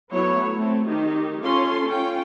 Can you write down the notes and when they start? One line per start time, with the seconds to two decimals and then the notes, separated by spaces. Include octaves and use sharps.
0.11 F#3 A3 B3 E4 C#5
0.56 A3 C4
0.87 D#3 D#4 G4
1.43 C#4 F4 A4 C6
1.88 C#4 F4 G5